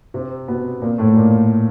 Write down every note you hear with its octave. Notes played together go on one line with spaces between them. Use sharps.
C3 C4
B2 B3
A#2 A#3
A2 A3
A#2 A#3